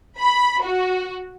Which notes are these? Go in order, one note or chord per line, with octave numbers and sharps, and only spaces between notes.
B5
F#4